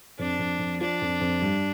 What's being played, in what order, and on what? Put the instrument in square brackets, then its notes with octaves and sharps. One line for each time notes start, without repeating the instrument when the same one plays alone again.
[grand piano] F2 [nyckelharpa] D4
[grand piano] F2
F2
[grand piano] F3 [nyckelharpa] D4
[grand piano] F2
F2
G2